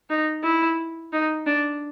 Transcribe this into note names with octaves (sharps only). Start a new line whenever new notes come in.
D#4
E4
D#4
D4